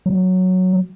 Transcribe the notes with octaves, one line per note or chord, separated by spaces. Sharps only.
F#3